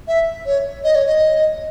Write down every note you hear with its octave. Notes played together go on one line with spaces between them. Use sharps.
E5
C#5
D#5
C#5
D#5